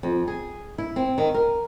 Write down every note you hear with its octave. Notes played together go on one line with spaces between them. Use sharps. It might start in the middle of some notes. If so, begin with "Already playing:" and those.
F2
G#4
E4
C4
D#3
A#4